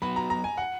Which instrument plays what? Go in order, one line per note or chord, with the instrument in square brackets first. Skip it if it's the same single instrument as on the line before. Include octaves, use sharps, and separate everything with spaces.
[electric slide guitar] F#3 B3 F#4 [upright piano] B5
[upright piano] A#5
A#5
G#5
F#5